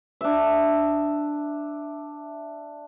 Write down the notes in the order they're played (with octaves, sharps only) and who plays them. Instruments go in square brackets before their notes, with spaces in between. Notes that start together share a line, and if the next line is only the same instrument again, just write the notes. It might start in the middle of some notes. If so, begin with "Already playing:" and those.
[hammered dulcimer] D4 E5